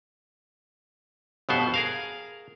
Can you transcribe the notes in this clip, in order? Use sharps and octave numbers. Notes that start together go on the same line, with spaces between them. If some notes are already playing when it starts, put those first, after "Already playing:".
G1 F2 B2 B3 C5
G#4 A#4 F5